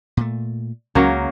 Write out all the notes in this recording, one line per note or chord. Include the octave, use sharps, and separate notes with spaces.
A#2 A3
C#2 C#3 F#3 A#3